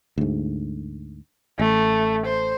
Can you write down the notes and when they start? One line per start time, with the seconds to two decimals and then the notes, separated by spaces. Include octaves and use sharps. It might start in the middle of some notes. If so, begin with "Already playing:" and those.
0.18 D2 G#2
1.59 A1 A3
2.26 C5